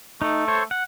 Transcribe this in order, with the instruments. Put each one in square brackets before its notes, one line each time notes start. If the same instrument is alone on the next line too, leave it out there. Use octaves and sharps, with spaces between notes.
[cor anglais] A3 [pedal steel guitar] D#4
[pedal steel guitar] A4 C5 C#5
F#5